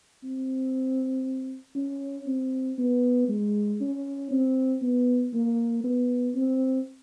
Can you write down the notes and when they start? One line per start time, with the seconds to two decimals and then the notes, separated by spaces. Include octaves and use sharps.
0.24 C4
1.75 C#4
2.27 C4
2.78 B3
3.29 G#3
3.80 C#4
4.31 C4
4.82 B3
5.33 A#3
5.84 B3
6.35 C4